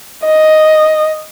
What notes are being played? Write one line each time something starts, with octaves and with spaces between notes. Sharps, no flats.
D#5